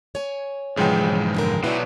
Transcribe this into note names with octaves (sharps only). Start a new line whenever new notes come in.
C#5 G#5
B1 G#2 C#3 E3 F3 G#3 G5
F#2 D3 A#4
B2 F#3 E4 B4 D5